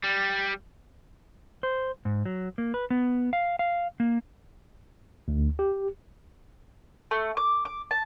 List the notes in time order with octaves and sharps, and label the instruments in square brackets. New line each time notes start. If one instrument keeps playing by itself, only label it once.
[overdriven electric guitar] G3
[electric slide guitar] C5
G#2
F#3
A#3
B4
B3
F5
F5
A#3
[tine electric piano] D2
G4
[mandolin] A3
D6
D6
A5